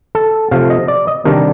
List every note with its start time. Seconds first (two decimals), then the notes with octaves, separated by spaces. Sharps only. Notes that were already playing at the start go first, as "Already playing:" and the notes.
0.15 A4
0.51 C3 F3 A3 F5
0.70 D#5
0.88 D5
1.07 D#5
1.25 C3 D#3 G3 D4 A#4